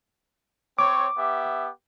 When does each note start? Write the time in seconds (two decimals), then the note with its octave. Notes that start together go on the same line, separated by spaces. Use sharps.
0.79 C4 C#5 D6
1.17 B3 G4 E5